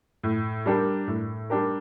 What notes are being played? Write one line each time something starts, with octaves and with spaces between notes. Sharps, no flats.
A2
G3 D4 G4 A#4
A2
G3 D4 G4 A#4